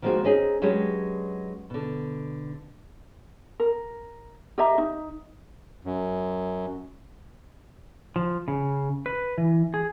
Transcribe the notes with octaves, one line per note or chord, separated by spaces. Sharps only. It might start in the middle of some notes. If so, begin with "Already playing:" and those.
D#3 F3 G#3 A#3 C4 F#4
C4 C#4 D#4 G#4
F#3 G#3 C#4 D4 G4 B4
B2 D3
A#4
G4 D#5 E5 A#5
D#4
F#2
F3
C#3
B4
E3
G#4